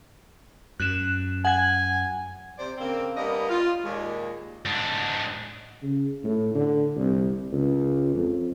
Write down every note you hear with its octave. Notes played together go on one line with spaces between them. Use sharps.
F#2 F#6 E7
F#5 G#5 G#6
C3 C5 D5
C#3 A#3 C4
G3 A#3 B3 D4 D#5
F4
D#2 A#2 G#3
G#2 D4
C#3
A2
D3
C2
C#2
F2